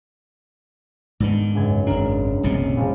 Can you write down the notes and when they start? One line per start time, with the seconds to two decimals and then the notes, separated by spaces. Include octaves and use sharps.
1.20 G#2 D#3 B3 D4
1.55 C#2 F#2 G#6
1.87 G#1 D4 A#4
2.43 D#1 C2 B2
2.77 A#1